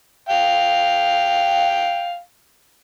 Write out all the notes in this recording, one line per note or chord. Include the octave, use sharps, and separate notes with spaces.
F5 G5